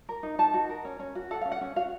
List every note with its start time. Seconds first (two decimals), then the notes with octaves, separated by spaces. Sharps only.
0.09 A#4
0.23 D#4
0.38 D#4 A5
0.54 F#4
0.69 A#4
0.85 C#4
1.00 C#4
1.15 F#4
1.31 A4 F#5
1.41 C#4 F5
1.52 F#5
1.61 C#4
1.76 F#4 F5